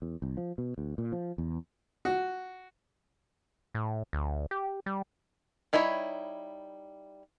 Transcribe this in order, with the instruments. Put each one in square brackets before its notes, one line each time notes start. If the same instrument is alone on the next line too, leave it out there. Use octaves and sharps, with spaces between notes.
[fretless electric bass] E2
C2
F3
B2
D2
A#2
F3
E2
[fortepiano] F#4
[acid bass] A2
D2
G4
G3
[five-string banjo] G3 D#4 E4 C#5 B5